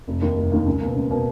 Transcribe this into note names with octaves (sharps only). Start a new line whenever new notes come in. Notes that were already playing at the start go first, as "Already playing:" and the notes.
F1
D#2 D#3 A#3
F1
D#2 D#3 A#3
C#2
B2 A#3
C#2
B2 A#3